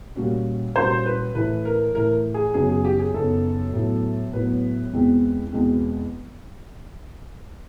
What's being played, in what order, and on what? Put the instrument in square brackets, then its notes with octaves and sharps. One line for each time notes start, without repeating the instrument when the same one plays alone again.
[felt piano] A#2 G3 A#3 C#4 F#4
[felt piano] A#2 G3 A#3 C#4 F#4 [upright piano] C5
[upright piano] B4
[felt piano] A2 E3 A3 [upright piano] B4
[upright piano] A#4
[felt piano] A2 E3 A3 [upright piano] A#4
[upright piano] G#4
[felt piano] F#2 C#3 F#3 B3 D#4 [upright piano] G#4
[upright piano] G#4
G4
G#4
[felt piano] F#2 C#3 F#3 B3 D#4 [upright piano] A4
[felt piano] A2 F#3 B3
[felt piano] A2 F#3 B3 [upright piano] B4
[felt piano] E2 B2 G#3 C4
E2 B2 G#3 C4